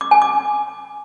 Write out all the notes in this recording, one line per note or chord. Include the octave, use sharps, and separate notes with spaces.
D6
G#5
D6